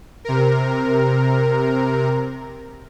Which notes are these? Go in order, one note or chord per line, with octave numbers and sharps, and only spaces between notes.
C3 A#4